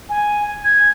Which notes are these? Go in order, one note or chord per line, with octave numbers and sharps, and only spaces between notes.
G#5
G#6